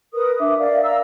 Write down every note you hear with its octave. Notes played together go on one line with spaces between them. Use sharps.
A#4 B4 D#6
D4 E5 D6
A#4 D5 E5 F5
F5 A#5 E6